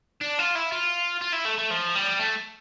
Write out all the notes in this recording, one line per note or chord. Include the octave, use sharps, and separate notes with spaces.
D4
F4
E4
F4
F4
E4
A3
A3
F3
G3
A3